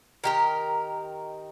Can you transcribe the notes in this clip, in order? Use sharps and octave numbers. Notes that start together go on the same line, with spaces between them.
D#3 G4 A#4